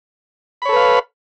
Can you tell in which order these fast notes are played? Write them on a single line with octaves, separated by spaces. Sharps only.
B5 C#5 A4 B4 F5